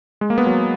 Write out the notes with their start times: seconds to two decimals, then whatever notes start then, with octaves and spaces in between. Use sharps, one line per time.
0.21 G#3
0.30 A#3
0.38 B3
0.46 F#3